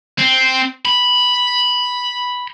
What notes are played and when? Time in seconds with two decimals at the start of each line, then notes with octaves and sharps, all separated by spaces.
0.19 C4
0.86 B5